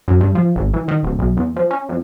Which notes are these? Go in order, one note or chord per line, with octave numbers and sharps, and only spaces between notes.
F#2
G2
F3
G#1
E3
D#3
D1
B1
E2
F3
C#4
F2